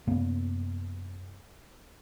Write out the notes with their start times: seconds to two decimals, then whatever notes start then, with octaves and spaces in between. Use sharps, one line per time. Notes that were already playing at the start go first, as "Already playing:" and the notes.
0.07 F#2 C3 A#3 B3